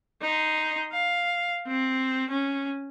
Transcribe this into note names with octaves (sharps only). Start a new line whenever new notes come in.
D#4 C6
F5
C4
C#4